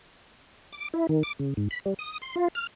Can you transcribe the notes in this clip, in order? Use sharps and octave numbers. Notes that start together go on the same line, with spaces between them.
D6
E4
D#3
D6
C#3
G#2
B5
G3
D#6
C6
F4
F6